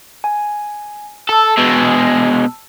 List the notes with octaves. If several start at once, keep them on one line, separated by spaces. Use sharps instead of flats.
G#5
A4 A5 E6
B2 G#3